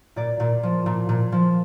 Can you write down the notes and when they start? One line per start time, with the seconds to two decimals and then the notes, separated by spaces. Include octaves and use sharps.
0.16 A#2 D5
0.40 A#2
0.63 F3
0.86 A#2
1.09 A#2
1.32 F3